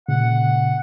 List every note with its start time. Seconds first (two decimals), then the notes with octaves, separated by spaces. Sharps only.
0.09 A#2 C#3 F#5